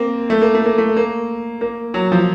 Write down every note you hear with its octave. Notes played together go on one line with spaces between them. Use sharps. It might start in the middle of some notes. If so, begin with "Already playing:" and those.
Already playing: A#3 C4
A3
A#3
A3
A#3
A3
A#3
A#3
F#3
F3